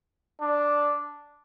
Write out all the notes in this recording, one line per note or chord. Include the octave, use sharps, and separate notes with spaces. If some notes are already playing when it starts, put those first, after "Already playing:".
D4